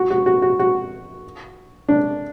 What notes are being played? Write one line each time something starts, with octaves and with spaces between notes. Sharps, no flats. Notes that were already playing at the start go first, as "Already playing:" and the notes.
Already playing: F#4
F#4
F#4
F#4
F#4
D4